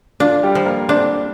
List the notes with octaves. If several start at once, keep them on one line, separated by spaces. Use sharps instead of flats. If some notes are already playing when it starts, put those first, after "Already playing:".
D4 F4
G3 G4
F3
A#3 A#4
C4 D4 C5